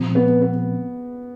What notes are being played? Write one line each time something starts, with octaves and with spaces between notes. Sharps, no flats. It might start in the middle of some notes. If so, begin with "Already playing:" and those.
Already playing: A#2 F3 G#3 C4
B3
B3